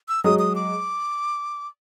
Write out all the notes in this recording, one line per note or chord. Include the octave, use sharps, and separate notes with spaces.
E6
F#3 G#3 D#6
D#6
D6